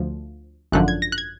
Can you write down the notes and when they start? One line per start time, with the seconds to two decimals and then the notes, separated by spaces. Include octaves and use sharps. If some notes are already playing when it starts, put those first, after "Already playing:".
Already playing: D2 F3
0.72 G#1 F#2 D3 F3 F#6
0.88 G#6
1.02 A#6
1.12 F#6
1.18 G#6